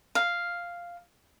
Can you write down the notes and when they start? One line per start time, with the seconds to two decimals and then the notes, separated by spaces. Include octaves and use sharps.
0.15 F5